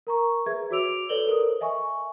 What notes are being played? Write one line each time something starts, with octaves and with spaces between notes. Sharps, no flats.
A#4 A#5 C#6
G#4 B4 E5 G#6
F#4 C#5 D6 E6 D7 F7
A4 B4 C#5 D5 F#7 G7
A4 A#4 C5 D#6
D#5 E5 G#5 C#6